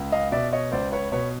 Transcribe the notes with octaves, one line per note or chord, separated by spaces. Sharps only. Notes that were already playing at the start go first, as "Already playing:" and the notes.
Already playing: C#2
D#5 F5
B2 D5 E5
C#5 D#5
C#2 C5 D5
B4 C#5
B2 B4 C#5